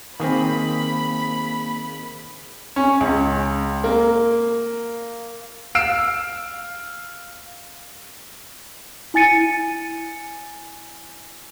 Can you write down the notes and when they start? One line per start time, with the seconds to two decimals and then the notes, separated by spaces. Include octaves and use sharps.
0.20 D#3 A#3 C4 G#4 B5
2.76 C#4
3.01 C#2
3.84 A#3
5.75 F5 E6 C7 D7 E7
9.14 E4 G#5 A6 C#7 D#7